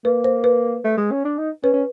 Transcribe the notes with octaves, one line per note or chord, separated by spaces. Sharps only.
A#3 B4
C5
B4
A3
G#3
C#4
D4
D#4
C#4 B4
C#4